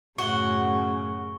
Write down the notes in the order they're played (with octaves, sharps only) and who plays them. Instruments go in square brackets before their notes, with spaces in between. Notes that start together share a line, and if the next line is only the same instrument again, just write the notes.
[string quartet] F#2 A2 C#3 [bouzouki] F#4 [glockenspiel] C#6 G7